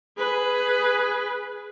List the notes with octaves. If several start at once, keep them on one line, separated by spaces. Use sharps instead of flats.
G#4 B4